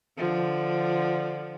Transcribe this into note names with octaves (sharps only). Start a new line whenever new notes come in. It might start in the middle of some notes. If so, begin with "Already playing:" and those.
D3 F3